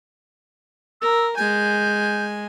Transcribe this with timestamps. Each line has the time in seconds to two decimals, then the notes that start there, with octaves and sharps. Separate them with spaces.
1.01 A#4 E6
1.36 G#3 G#5 G6